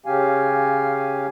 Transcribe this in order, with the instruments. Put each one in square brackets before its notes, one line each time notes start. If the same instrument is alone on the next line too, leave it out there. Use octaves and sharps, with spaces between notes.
[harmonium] C#3 C#4 G4 F5 G#5